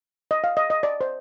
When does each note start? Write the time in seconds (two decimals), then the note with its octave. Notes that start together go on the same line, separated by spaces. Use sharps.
0.31 D#5
0.44 F5
0.57 D#5
0.70 D#5
0.83 D5
1.01 C5